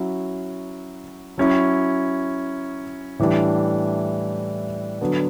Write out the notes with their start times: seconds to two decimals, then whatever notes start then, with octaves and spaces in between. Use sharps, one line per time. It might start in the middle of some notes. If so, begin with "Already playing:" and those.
Already playing: F#3 C#4 E4
1.38 F#3 C#4 E4
3.19 A2 E3 G3 D4
5.01 D3 F#3 B3